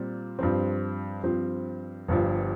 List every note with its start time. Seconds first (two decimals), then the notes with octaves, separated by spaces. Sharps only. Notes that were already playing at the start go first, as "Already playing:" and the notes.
Already playing: A#2 G3 C4
0.39 G2 F3 C4
1.23 G2 F3 C4
2.08 G1 G2 F3